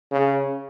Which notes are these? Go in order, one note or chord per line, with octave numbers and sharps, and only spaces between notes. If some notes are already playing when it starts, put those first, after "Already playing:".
C#3